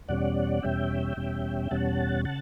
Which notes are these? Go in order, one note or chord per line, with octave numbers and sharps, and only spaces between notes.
E2 B2 G3 C#4 D5 F#5
E2 B2 G3 C#4 E5 G5
E2 B2 G3 C#4
E2 B2 G3 C#4 F#5 A5
C#3 F#5 A5